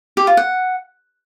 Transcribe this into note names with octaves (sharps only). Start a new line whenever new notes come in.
G4
F4
F#5